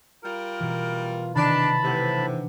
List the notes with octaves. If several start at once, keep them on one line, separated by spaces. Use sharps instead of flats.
G3 F4 A#4
B2 E3
C3 D#3 E3 D4 A5 B5
A2 C3 B4 F#5
D4